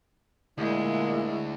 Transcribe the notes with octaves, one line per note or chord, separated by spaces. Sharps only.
D2 A#2 G#3 E4